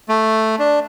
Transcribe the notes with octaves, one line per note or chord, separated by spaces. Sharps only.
A3
D4